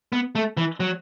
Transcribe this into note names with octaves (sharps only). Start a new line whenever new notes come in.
B3
A3
E3
F#3